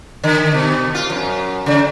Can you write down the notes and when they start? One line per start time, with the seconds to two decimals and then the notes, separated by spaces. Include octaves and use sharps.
0.24 D3
0.54 B2
0.95 F4
1.10 F#2
1.66 C#3